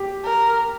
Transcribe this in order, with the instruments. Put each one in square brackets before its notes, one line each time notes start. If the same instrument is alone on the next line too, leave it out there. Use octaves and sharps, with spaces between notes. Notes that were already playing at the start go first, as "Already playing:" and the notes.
Already playing: [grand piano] G4
[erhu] A#4